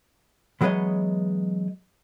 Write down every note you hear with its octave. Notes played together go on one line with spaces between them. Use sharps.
E3 F#3 G#3 B3 C#5 D#5